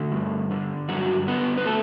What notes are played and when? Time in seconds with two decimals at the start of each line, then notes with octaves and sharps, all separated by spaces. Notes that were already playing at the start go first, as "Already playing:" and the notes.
Already playing: D3 A3
0.11 G2
0.51 D3
0.89 G2 F#3 F#4
1.27 D3 B3 B4
1.57 B4
1.66 A3 A4